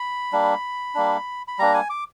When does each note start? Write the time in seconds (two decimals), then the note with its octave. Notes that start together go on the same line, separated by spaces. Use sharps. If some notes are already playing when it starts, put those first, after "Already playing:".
Already playing: B5
0.32 G3 A#3 D4
0.95 G3 A#3 D4
1.48 B5
1.59 G3 A#3 D4 A#5
1.74 G#5
1.90 D6